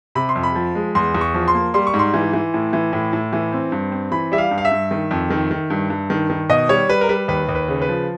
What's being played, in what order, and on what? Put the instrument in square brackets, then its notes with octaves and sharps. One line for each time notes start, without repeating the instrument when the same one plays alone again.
[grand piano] C3 B5
C6
F2
B5
F3
G#3
E2 C6
E2
C#6
F3
C6
A#3
G3 C6
C#6
G#2
C6
E3
E3
A2
E3
A2
A2
E3
C4
G2
C4
E3 B5
G3 E5
F5
G2
F5
E5
G2
D#3
F2
D#3
D#3
G2
G2
D#3
D#3
B2 D#5
G3 C#5
G3 B4
A#4
G3 B4
D#2 B4
D#2
B4
C#3
B4
F3